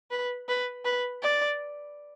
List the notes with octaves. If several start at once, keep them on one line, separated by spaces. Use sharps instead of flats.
B4
B4
B4
D5